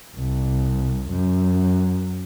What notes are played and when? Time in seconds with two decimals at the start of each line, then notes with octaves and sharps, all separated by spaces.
0.16 C2
1.10 F#2